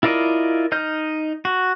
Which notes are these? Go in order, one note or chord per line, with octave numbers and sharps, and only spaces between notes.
E4 F4 A#4 D5 D#5
D#4 D#5 F6 G6
F#4